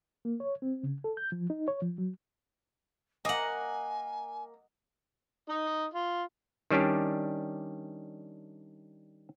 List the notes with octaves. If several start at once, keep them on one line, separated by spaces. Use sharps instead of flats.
A#3
C#5
C4
C#3
A4
G6
F3
D#4
C#5
F3
F#3
A#3 D#5 F#5 G#5
D#4 D#5
F4
D#3 G3 C#4 D4 G4